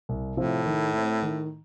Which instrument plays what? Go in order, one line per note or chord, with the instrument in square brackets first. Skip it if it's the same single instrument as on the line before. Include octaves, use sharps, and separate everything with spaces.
[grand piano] C2
[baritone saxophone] A2 [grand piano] C3 F3 C4
[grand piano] D#3
A3 C4
D#3